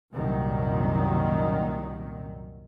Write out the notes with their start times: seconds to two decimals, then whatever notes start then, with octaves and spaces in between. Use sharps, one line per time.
0.14 C2 F#2 A#2 D#3 F#3